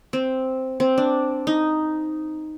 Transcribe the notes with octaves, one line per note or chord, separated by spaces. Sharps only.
C4
C4
D4
D#4